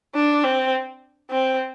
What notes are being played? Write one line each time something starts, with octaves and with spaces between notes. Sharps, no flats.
D4
C4
C4